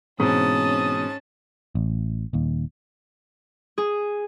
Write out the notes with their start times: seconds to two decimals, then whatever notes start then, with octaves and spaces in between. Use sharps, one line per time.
0.20 G#2 B2 E3 C4 C#4 A5 D#6
1.75 A1
2.33 D#1 D#2
3.78 G#4